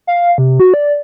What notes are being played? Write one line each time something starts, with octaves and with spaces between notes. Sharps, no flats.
F5
C3
F#4
D5